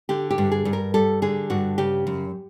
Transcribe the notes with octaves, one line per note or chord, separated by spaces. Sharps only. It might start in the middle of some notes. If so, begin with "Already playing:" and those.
D3 G4
G4
G2
G#4
G2
A#4
G3 A4
D3 G#4
G2 F#4
C#3 G4
F#2